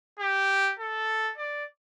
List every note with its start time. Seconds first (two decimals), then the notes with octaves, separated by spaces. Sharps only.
0.19 G4
0.79 A4
1.37 D5